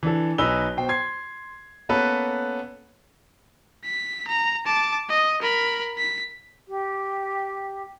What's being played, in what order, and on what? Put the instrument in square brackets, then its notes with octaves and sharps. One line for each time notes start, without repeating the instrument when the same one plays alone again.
[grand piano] E3 D4 A4
B1 D#4 B4 G#5 E6 G7
B2 C5 G5
C6 G#6 C7
A#3 B3 C#4 A4 B4
[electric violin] B6
A#5
A5 D6
D#5
A#4 B5
B6
[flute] G4